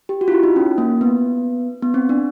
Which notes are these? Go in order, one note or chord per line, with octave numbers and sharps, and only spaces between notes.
G4
F#4
F4
E4
D#4
C#4
A#3
B3
B3
C4
D4